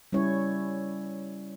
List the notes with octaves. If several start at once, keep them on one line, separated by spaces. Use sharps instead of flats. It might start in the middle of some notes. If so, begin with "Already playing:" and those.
G3 C#4 E4 C#5